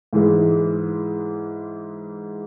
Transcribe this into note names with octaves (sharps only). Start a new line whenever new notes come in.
G#2 E3 G#3